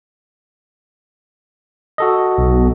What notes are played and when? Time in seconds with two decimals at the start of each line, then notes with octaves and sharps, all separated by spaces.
1.98 F#4 A4 D#5
2.38 B1